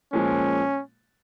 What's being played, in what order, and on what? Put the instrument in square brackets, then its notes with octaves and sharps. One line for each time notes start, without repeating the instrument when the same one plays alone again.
[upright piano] A#2 F3 G#3 [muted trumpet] C#4